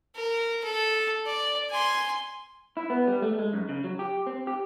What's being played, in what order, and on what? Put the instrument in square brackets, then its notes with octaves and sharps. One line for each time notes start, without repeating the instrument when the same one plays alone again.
[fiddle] A#4
A4
D5
G#5 C6
[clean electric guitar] E4
B3
G3
A3
G#3
F#2
C#3
F#3
G4
C4
G4